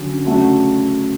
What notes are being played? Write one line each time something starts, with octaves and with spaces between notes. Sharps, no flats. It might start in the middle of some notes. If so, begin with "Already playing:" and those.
Already playing: D3 F#3 C#4 F#4
C#3 F#3 A3 D4 F#4